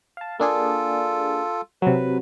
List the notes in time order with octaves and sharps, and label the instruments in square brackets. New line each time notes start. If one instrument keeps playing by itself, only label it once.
[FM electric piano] F5 A5
[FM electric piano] A#3 D4 G#4 [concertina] F4 A4
[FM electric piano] C3 F#3 [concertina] B4